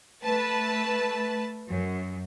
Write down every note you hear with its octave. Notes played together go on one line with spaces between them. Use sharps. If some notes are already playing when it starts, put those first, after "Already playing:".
A3 B4 A5
F#2